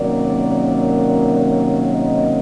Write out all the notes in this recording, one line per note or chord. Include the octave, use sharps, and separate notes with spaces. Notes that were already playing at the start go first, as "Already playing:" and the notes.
Already playing: C3 D#3 F#3 A#3 C#4 D5
D#5